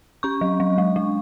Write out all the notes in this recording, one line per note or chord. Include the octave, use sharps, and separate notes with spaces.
C#4 C#6
F#3
F#3
G#3
G#3